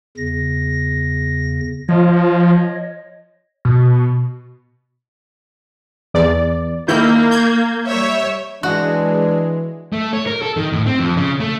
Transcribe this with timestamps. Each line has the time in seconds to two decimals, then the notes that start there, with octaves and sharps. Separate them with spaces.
0.17 E2 C#3 A#6
1.89 F3 C#5 D#5
3.65 B2
6.14 E2 D5
6.88 D#3 A#3 E4 G6
7.31 G6 G#6
7.87 G3 C#5 E5
8.63 E3 G#3 D4 F#4
9.93 A3
10.13 C#5
10.27 A#4
10.42 A4
10.57 D#3
10.72 A2
10.86 C4
11.00 F2
11.17 C#3
11.40 A3